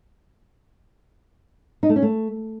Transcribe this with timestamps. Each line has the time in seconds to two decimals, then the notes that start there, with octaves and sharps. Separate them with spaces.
1.83 D#4
1.89 A3
1.96 C#4
2.02 A3